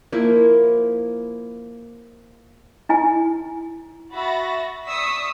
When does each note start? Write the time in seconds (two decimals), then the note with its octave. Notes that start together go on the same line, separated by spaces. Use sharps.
0.12 F3 A#3 E4
2.89 E4 G#5
4.12 F#4 E5 B5 A6 A#6
4.87 D5 C#6 D#6 E6 B6